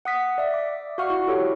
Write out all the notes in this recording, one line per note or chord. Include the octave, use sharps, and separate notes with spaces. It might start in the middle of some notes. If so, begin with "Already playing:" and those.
F#5 D#6 B6
D5 E5 F5
D6
F#4 D5 F5 F#5 C#6 F6
E4 F#4
E4 G4 A4 C#5